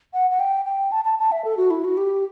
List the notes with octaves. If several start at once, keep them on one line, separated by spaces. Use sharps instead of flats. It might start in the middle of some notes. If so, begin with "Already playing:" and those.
F#5
F#5
G5
G5
A5
A5
A5
E5
A4
F#4
E4
F#4
G4